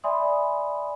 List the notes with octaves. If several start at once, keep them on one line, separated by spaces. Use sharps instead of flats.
D5 E5 G#5 B5 C6 D#6